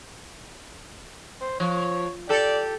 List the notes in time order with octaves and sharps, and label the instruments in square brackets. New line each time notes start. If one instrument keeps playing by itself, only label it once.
[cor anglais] C5
[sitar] F3 [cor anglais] C#5
[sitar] G4 A4 [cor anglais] D5